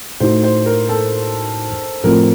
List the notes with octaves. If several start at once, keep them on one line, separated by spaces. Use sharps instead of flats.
A2 A3 D#4 F#4 C5
C5
A#4
A4
A2 F3 A3 C4 F4 A#4